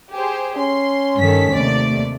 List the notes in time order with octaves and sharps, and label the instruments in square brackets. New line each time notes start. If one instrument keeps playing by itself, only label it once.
[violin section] G4 G#4 C5
[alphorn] C#4 [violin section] C6
[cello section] G2 D#3 A4 [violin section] B6
[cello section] D#2 C3 A3 [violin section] D5